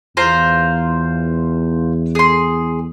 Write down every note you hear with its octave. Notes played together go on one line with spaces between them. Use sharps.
E2 F4 C5 A#5
G#4 C6